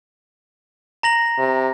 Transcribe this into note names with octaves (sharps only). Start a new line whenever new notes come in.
A#5 A#6 F#7
C3